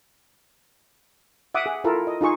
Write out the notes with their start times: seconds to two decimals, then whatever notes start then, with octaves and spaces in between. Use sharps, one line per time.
1.55 E5 F#5 D6 D#6
1.66 G#4
1.84 E4 F4 A4 A#4
2.07 D#5
2.21 D#4 F4 G#4 C#6